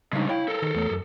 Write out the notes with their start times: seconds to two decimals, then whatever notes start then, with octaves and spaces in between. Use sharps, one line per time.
0.13 C#3 G3 G#3 D4 D#4
0.29 E4 C#5 F5 G5
0.48 A4 A#4
0.62 D#3
0.74 E2 A3 C#5
0.90 F#2